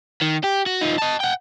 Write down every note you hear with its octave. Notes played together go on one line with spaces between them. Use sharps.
D#3
G4
F#4
F3 D#4
D#5 A5
F#5 G5